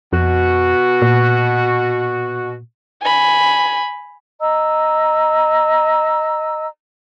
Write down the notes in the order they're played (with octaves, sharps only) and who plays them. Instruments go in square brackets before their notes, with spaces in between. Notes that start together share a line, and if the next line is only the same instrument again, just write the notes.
[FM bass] F2 [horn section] B2 F#4
[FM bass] A#2
[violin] G#5 B5
[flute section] D#5 A#5 E6